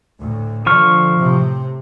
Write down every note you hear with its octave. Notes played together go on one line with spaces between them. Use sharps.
D2 A2
D3 F3 C#6 F6
A2 C3